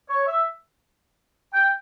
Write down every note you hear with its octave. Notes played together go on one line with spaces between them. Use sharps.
C#5
E5
G5